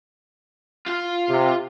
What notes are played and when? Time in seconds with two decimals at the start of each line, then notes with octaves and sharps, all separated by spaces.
0.86 F4 F5
1.29 C3